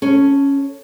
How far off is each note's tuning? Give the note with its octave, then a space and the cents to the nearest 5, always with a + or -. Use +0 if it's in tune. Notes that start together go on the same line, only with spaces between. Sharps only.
C#4 +0 A4 +0